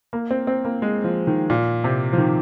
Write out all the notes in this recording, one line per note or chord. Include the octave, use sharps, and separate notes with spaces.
A#3
C4
C4
A#3
G#3
F3
D#3
A#2
C3
F3
D#3